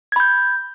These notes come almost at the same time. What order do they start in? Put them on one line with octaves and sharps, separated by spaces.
G#6 B5 G6